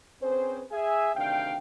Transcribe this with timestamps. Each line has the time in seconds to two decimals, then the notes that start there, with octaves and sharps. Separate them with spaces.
0.22 C4 C#4 G#4 B4 C5
0.72 G#4 E5 G#5
1.16 D2 C3 D#3 D4 F5 G5